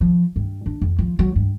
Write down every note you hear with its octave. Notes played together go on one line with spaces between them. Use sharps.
F3
G2
D4
F2
F3
F#3
G2